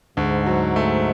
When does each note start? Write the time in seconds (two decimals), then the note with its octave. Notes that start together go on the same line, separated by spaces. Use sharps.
0.17 D2 G#2
0.46 F#3
0.76 A3